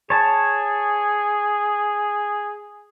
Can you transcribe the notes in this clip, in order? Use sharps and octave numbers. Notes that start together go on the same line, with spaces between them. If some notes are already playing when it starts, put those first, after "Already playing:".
G#4 C#5 A5